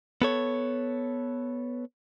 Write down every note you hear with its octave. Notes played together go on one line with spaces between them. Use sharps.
B3 A4 C#5